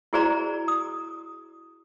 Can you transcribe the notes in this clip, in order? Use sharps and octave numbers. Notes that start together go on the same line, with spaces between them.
E4 F#4 G#4 C5 D5 A#5
D#6